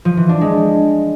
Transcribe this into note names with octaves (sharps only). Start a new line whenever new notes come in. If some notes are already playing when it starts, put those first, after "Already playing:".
F3
E3
D4
G#3